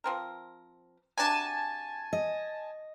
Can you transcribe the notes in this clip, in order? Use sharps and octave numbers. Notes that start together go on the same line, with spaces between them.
F3 C4 A#4
C3 D4 F#4 G#5 A5
D#5